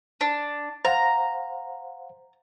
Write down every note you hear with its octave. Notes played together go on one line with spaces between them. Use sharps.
D4
C5 F5 F#5 A#5